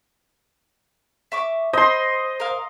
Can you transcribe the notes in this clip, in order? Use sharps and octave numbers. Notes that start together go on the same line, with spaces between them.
E5 C#6 D6
C5 D#5 B5 C6
A#4 F5